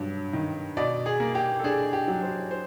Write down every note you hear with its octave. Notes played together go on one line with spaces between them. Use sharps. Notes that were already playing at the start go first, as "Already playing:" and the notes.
Already playing: G2 F#3
D#3
B2 D5
G#4
A#3
G4
A4
D4 G#4
G4
F#3
C5
C5